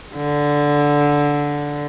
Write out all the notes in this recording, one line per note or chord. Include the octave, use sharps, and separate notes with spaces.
D3